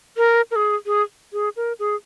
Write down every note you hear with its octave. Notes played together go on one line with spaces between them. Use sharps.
A#4
A#4
G#4
G#4
G#4
A#4
G#4